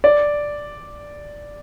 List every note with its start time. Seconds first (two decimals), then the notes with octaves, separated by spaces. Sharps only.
0.04 D5